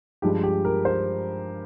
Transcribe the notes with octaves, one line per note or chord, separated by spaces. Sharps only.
G2 F3 G#3 G4
G4
A#4
C5